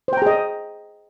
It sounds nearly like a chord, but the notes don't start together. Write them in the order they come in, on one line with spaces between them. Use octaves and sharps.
C5 G5 A#5 G#4 D#5